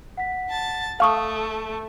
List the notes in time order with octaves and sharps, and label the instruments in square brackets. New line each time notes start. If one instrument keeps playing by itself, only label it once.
[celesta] F#5 B6
[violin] A5 A6
[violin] A3 [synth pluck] F5 C#6 D#6 [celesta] A5